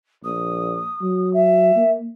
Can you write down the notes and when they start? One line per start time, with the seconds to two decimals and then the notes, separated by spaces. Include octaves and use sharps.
0.24 A#1 D#6
1.02 F#3
1.33 E5
1.76 A#3